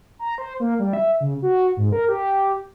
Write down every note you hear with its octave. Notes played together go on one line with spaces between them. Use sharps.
A#5
C5
A#3
G3
E5
C#3
F#4
G#2
A#4
G4